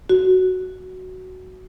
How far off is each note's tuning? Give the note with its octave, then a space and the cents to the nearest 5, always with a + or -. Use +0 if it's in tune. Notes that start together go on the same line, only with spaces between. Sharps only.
F#4 +5